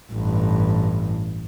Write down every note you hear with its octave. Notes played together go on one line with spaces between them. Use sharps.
A1 G2